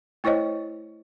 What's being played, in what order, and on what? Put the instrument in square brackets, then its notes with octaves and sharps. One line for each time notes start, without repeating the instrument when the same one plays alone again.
[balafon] A3 E4 C5 C#5 D#5